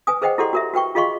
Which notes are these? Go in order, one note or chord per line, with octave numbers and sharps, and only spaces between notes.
B4 G#5 D#6
G#4 B4 C5 D#5 F#5 G5
E4 G4 A4 D5 F#5 C6
F#4 A#4 E5
F#4 B4 G5 C#6
F4 G#4 D#5 F5 C6 C#6